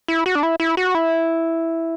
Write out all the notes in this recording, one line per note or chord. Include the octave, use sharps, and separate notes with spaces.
E4
F#4
D4
E4
E4
F#4
E4